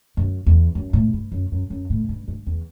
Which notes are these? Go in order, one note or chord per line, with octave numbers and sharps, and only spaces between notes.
F#2
E2
F#2
A2
G2
F#2
F#2
F#2
A2
G2
G2
E2